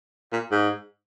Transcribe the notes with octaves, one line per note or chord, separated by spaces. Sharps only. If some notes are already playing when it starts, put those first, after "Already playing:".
A#2
G#2